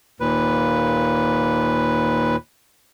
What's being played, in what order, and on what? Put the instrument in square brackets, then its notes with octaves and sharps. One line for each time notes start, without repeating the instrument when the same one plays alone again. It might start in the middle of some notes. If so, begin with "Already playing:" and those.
[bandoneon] D#2 A#2 B4